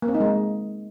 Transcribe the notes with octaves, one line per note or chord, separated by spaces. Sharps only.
A#3
C4
D#4
G#3